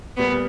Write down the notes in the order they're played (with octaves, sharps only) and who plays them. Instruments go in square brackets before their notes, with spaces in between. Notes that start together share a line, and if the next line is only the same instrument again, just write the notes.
[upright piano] A#2 G3 A#3 [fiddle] B3